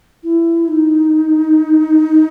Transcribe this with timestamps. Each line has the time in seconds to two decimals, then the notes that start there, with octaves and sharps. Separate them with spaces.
0.23 E4
0.68 D#4